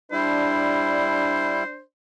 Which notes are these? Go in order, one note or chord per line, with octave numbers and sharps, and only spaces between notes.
G3 D4 E4 C5